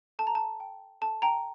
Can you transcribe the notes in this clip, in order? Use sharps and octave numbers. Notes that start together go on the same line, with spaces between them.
A4 A5
A#5
A5
G5
A4 A5
G5 A#5